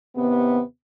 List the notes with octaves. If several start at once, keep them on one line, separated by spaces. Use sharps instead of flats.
D#2 C3 B3